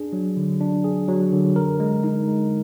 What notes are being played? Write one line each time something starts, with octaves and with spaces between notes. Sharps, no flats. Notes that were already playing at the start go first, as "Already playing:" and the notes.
Already playing: D4 G#4
F#3
D3
D4
G#4
F#3
D3
A#4
G#3
D#4
G#3